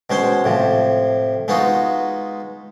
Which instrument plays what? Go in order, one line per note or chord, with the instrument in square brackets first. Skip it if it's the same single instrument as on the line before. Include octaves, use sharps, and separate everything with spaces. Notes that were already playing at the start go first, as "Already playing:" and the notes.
[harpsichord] B2 G#3 C#4 C5 G5
A2 C3 F3
G#3 B3 D#4 F4 F#4